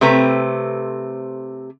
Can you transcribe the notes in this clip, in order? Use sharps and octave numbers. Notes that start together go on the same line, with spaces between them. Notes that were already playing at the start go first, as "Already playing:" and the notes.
C3 A3 C4 B4 A#5